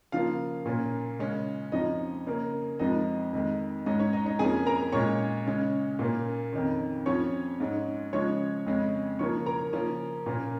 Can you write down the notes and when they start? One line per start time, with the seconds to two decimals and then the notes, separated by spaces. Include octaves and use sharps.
0.12 C#3 F3 A#3 F4 F5
0.65 A#2 A#3 C#4
1.19 C#3 G#3 C#4
1.72 F2 F3 C#4 D#4 D#5
2.27 C#3 A#3 C#4
2.79 F2 F3 G#3 D#4 D#5
3.33 F2 D#3 G#3
3.86 G#2 G#3 C#4 D#4 D#5
3.99 C#4 C#5
4.13 D#4 D#5
4.26 D#4 D#5
4.39 F2 F3 A#3 C#4 G#4 G#5
4.66 A#4 A#5
4.92 A#2 G#3 C#4 C#5 C#6
5.46 C#3 G#3 C#4
5.99 A#2 A#3 C#4
6.53 F2 D#3 C#4
7.06 F2 F3 C#4 C#5 C#6
7.60 G#2 G#3 C#4
8.13 C#3 F3 G#3 C#4 C#5 C#6
8.66 F2 C#3 G#3 C#4
9.19 C#3 F3 A#3 C#4 C#5 C#6
9.46 A#4 A#5
9.73 C#3 F3 A#3 C#4
10.26 A#2 A#3 C#4